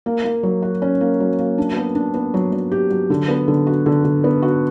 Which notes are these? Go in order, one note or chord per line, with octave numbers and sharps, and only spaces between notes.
A#3
A#3
F#3
F#4
C#4
A#3
F#3
A#3
D4
B3
D4
B3
F#3
F#3
G4
F#3
D3
B3
D3
F#4
D3
D3
B3
F#4